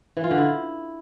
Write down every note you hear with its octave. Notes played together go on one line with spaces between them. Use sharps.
E3
F4
D3
E4